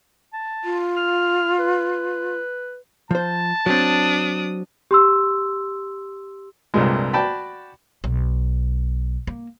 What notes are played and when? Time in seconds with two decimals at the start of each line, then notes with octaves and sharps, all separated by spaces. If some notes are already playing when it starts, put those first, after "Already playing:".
0.33 A5
0.64 F4
0.96 F6
1.59 B4
3.11 F3 C5 A5
3.66 F#3 C4 D4 D#6
4.91 G4 C6 E6
6.74 C2 G2 A#2 G3 G#3
7.13 F#4 D5 G5 A5 B5
8.04 B1
9.27 A#3